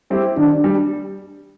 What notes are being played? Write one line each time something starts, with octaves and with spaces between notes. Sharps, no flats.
G3 C4 E4 G4
D#3 D4
G3